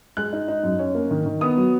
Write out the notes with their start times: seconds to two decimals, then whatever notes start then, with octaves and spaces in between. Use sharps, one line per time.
0.17 G#3 F#6
0.33 D#4
0.48 D#4
0.64 F#2
0.79 C#4
0.95 A#3
1.11 D#3
1.26 D#3
1.41 B3 D#6
1.57 F#3